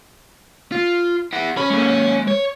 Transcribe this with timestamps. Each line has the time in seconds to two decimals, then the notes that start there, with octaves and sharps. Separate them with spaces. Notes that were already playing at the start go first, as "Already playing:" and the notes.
0.72 F4
1.33 E4 F#5
1.57 C#4 C#5 B5
1.70 G#3 A#3
2.28 C#5